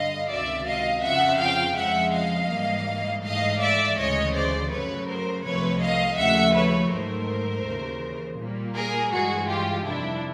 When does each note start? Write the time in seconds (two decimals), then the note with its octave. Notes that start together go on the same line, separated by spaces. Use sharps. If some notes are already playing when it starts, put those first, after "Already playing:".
Already playing: G2 D3 G3 D#5 F5
0.30 C#2 C3 D#3 F#3 D5 E5
0.66 D#5 F5
1.03 F2 C#3 F3 E5 F#5
1.40 F5 G5
1.76 F2 C#3 F3 G#3 E5 F#5
2.14 D#5 F5
2.50 G#2 E3 G3 A#3
3.24 G#2 E3 A3 D#5 F5
3.60 D5 E5
3.97 D2 C#3 E3 G#3 C#5 D#5
4.34 C5 D5
4.70 F#2 C#3 F#3 A3 B4 C#5
5.07 A#4 C5
5.44 C2 C3 F3 A3 B4 C#5
5.82 D#5 F5
6.18 D#2 C#3 F3 A3 E5 F#5
6.55 B4 C#5
6.91 G#2 D#3 F#3 A3 A#4 C5
7.65 D#2 C#3 E3
8.39 A#2 G3 A#3
8.75 G#4 A#4
9.12 G2 E3 G#3 F#4 G#4
9.49 F4 G4
9.86 F2 C3 D#3 G3 D4 E4